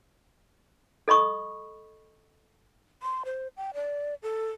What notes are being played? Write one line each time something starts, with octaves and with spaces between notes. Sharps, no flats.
A4 D#5 B5 C#6 D#6
C6
C5
G5
D5
A4